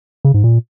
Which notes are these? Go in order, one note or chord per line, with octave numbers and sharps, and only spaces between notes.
C#3
G#2
A#2